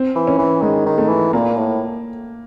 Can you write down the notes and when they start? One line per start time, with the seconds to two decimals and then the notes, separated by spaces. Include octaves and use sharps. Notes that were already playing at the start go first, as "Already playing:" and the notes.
Already playing: C4
0.16 E3
0.27 C#4
0.38 E3
0.62 D#3 G#3
0.86 D#3
0.98 A3
1.09 E3
1.33 A#2 A#3
1.57 A2